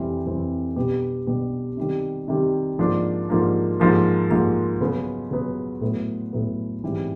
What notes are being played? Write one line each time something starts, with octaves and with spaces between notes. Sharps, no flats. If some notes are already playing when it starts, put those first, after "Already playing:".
Already playing: F2 C3 E3 G3 C4
F2 C3 E3 G3 C4
B2 G3 B3 D4 G4
B2 G3 B3 D4 G4
C3 D#3 G3
C3 D#3 G3
G#2 F3 A#3 D4
G#2 F3 A#3 D4
G#2 F3 A#3
G#2 F3 A#3
C#3 F#3 B3
C#3 F#3 B3
A2 F#3 B3
A2 F#3 B3
G#2 E3 G3 C4